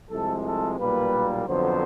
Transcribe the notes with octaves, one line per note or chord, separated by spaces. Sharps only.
C2 C3 F3 G#3 A4
A4
B1 A#2 G3 A#3 B4
F2 D3 F#3 B3 C5